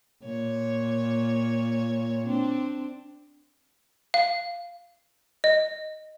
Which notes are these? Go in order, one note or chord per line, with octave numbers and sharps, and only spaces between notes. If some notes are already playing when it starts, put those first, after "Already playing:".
A#2 C#5
C4 D4
F5
D#5